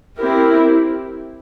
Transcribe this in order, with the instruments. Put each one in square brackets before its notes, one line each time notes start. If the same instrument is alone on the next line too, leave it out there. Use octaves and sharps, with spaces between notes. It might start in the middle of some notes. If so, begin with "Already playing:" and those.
[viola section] C4 E4 G4 A#4